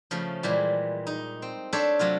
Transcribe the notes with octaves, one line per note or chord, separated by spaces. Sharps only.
C#3 F3 A3
A#2 E3 G3 G#3
D#4
C4
D4 A4 C5 C#5 E5
C3 F#3 A3 F4